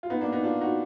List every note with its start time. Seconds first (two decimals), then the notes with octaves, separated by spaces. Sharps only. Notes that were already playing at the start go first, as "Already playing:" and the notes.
0.03 F4
0.10 B3 D#4
0.21 A#3 D4
0.32 B3 D#4
0.43 D4 F4
0.61 D#4 F#4